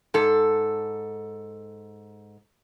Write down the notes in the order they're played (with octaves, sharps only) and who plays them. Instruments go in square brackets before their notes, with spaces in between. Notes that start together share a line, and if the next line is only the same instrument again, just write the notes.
[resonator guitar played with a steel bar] G#2 A4